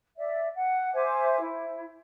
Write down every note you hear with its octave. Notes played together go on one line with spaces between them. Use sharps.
D5 E5
F#5
C5 E5 G#5 D6
E4